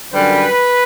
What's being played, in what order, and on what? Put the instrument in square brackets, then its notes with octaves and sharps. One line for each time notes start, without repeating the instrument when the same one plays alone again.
[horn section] F#2 D3 G3 B4